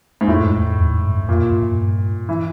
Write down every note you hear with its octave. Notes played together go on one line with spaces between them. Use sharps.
G#2
F2 A2
F#2
F2
E2
F2
G2
F#2
F2 A#2
G2
F#2
G2
E3